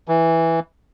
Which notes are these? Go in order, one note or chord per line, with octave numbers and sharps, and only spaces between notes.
E3